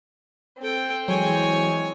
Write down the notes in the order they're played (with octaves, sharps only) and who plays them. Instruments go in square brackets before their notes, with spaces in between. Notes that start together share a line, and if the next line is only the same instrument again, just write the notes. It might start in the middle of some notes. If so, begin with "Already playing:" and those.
[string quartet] C4 [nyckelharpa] A4 G5
[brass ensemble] E3 G#3 [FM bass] F#3 [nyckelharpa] C#5 G#5